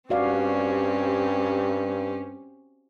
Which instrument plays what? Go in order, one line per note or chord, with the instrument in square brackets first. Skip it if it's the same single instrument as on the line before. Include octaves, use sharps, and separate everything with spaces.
[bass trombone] G2 [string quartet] C4 C#4 G4 [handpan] F#4 D5 F5